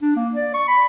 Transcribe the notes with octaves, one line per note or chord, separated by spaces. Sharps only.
D4
A#3
D5
C#6
B5